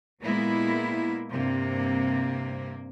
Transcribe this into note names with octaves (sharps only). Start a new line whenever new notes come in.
A#2 G#3 A#3 B3 E4
G2 C3 A#3